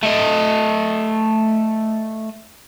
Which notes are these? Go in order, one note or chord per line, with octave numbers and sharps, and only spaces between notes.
A3 D#5